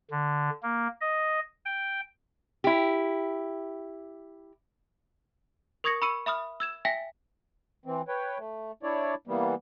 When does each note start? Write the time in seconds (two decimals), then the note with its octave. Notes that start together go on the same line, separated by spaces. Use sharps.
0.11 D3
0.63 A#3
1.01 D#5
1.65 G5
2.64 E4 G4
5.84 A#4 C#6 D#6 G#6 A#6 C#7
6.02 B5 C#6 E6 C#7 D#7
6.26 E5 B5 D#6 F6
6.60 E6 G#6 E7
6.85 E5 G5 G#5 A#6 B6
7.86 E3 C4
8.08 B4 C#5 G5
8.38 A3
8.83 D4 E4 C#5 D5
9.27 E3 G3 A#3 B3